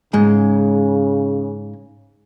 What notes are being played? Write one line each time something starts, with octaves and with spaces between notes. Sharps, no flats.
G#2 C#3 G#3